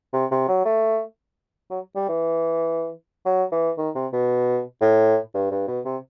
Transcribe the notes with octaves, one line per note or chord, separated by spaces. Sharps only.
C3
C3
F#3
A3
F#3
G3
E3
F#3
E3
D#3
C3
B2
A2
G2
G2
B2
C3